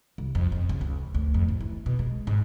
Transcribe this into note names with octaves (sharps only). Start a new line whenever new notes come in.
C2
F2
F2
C#3
C#2
D2
F2
A1
E3
B2
G#3
G#2